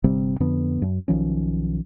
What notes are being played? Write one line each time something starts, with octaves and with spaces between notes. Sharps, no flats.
G1 C3 G3 C4
F2 D3 B3
F#2
B1 D#3 F3 C#4